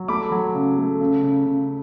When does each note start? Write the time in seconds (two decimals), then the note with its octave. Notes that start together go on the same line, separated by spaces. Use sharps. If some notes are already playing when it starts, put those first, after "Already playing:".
Already playing: F#3
0.08 A3 B5 D6
0.31 F#3
0.55 C#3
0.77 A3
1.00 C#3
1.23 C#3
1.46 C#3